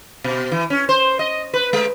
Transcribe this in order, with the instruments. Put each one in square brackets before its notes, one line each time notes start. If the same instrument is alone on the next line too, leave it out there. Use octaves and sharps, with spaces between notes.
[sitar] B2
E3
C#4
C5
D#5
B4
G#3